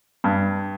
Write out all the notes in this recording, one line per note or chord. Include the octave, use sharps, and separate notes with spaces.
G2